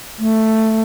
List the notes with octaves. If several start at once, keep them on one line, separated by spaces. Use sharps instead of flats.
A3